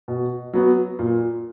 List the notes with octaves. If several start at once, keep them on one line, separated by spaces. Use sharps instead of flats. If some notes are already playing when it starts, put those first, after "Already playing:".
B2
F#3 B3 F#4
A#2